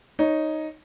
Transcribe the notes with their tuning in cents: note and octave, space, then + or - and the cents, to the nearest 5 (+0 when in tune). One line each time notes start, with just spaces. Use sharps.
D#4 +0 C#5 +0